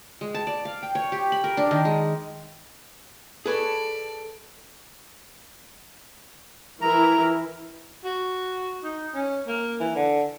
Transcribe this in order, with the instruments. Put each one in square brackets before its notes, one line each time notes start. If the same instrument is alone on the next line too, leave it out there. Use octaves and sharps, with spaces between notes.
[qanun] G#3
A5
D5
F5
G5
C#5
G4
B5
A#4
D4
D#3
G#3
[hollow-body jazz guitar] G#4 B4 C#5 [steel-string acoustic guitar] A4 [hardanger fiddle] D5
[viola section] E3 E4 A#4 [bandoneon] A#5
[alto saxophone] F#4
D#4
C#4
A#3
E3
D3